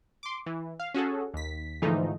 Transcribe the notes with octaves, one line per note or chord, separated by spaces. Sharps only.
C6 D6
E3
F5
C#4 F#4 G#4 A4
D#2 B6
G#2 D3 E3 F3 A3 D#4